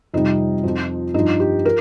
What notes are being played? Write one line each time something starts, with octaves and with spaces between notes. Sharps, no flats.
F2 C3 G3 D#4
F2 F3
G2 F3 D#4
G4
F3 A#4